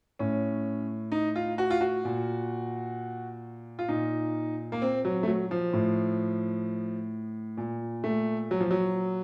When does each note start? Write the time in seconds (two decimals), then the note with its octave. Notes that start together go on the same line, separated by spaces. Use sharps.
0.19 A2 C#4
1.12 D#4
1.36 F4
1.58 F#4
1.70 F4
1.81 F#4
2.05 A#2
3.79 F4
3.88 A#2 D#4
4.72 A#3
4.82 C4
5.05 F#3
5.23 A3
5.28 F#3
5.51 F3
5.73 A2
7.57 A#2
8.04 A3
8.51 F#3
8.61 F3
8.71 F#3